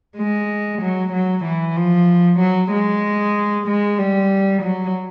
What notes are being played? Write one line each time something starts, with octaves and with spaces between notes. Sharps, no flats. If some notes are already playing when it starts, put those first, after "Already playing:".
G#3
F#3
F#3
E3
F3
F#3
G#3
G#3
G3
F#3